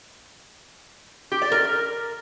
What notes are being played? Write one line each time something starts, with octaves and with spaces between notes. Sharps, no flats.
G4
D5
A#4